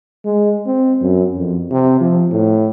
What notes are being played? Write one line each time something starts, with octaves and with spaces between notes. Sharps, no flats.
G#3
C4
F#2
F2
C3
F3
A2